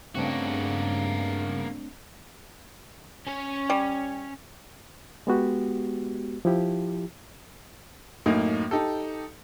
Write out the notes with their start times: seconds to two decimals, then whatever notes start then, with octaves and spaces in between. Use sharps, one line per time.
0.15 G2 C#3 A3 A#3 C4 D4 F#4
3.27 C#4 C#5
3.70 G3
5.27 G#3 B3 F#4 G4
6.45 F3 E4 G4
8.26 F#2 A2 A#3 D#4
8.71 D#4 G4 A4